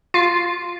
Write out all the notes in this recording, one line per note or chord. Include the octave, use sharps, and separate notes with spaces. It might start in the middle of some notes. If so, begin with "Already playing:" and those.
F4